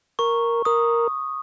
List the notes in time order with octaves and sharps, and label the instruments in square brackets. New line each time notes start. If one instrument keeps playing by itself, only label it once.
[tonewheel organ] A#4 [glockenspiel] C#6
[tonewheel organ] A#4 [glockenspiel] D#6